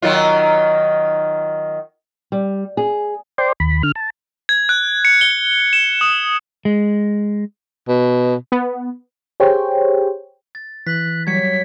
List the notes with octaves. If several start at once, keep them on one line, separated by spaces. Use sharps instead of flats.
D#3 F#3 F4
G3
G#4
C5 D5 G5 C6
D#2 B5
D3 F6
A5
G#6
F#6
C#7
G7
E7
D#6
G#3
B2
B3
G4 G#4 C5 C#5 G5
A6
E3 F#6 B6
F#3 G3 G#6 B6 C#7